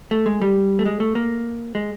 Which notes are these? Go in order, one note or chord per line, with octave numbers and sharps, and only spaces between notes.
A3
G#3
G3
A3
G#3
A3
A#3
G#3